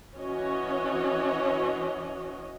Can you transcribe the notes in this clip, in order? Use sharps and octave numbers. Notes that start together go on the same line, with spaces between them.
E3 C#4 F#4 C#5 D#5